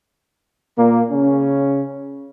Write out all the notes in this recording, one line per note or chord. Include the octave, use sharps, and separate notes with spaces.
A#2 A#3
C#3 C#4